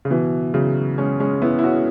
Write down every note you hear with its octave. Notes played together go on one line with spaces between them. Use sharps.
C#3
B2 E3
C#3 F#3
G#3 C#4
G#3 C#4
B3 E4
E4
C#4 F#4